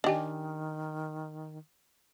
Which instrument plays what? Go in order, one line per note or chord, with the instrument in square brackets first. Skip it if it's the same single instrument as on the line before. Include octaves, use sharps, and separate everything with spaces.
[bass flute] D#3 [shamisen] D4 G4 [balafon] D#5 G#5